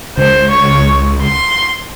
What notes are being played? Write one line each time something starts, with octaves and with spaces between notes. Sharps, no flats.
C#2 C5
C#5
C6